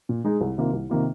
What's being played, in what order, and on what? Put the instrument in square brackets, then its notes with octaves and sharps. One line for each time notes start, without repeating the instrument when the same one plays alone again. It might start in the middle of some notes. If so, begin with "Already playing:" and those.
[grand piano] A#2
G#3 D#4 G#4
C2
C3 D#3 A#3 F4
C2
C3 D#3 A#3 F4